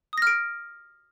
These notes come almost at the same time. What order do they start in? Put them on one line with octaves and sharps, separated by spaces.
D#6 A#6 F6 D7